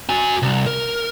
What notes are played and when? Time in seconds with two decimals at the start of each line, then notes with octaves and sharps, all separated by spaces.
0.09 F#4 G#5
0.42 C2
0.67 A#4